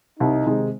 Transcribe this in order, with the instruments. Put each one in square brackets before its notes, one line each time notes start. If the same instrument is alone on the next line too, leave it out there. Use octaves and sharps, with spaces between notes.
[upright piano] C2 [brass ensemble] D#4
[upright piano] C3 D#3 G#3